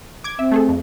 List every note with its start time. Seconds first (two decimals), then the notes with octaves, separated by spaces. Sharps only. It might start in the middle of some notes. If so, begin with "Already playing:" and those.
0.24 D6 G#6
0.39 C4 E5
0.52 A3 G#4 A4
0.69 F2